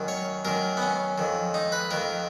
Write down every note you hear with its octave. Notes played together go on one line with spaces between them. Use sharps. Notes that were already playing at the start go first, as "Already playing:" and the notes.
Already playing: F#2 D#3
C#5
F#2 D#3 A#4
B3
C#4
F2 D#3
D#4
B4
F2 D#3 A#4